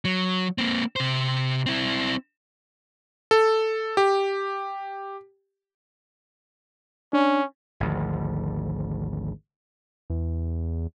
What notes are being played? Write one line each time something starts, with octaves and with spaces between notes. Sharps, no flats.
F#3
A#3 C4
C3 C5
C4 E4
A4
G4
C#4 D4
G#1 D2 F3
E2